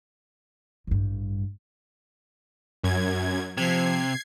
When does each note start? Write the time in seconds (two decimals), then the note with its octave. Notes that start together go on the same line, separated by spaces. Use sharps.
0.87 A1 G2
2.84 F#2 G#6
3.57 C3 F3 G#6 C7